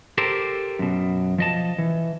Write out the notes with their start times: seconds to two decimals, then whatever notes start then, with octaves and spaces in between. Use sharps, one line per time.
0.18 G4 A4 A#4 C5
0.79 F#2 B2
1.38 F3 D#5 A5
1.78 E3